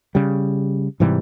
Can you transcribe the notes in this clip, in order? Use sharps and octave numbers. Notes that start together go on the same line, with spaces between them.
C#3 G3
G#2 C3 E3 G3